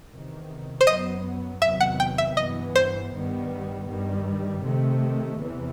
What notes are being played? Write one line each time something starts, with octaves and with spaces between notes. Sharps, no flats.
E2 C3 D#3
C5
F#2 F#3 B3 D#5
E2 C3 D#3 F#3 B3 E5
F#5
G5
E5
G2 E3 B3 D#5
C5
G2 D#3 G3 B3
G2 D#3 G3
C3 D#3 A3
E2 C3 E3